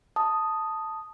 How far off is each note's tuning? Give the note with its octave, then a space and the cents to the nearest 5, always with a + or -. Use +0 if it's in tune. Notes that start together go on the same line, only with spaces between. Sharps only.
A5 +5 D#6 +0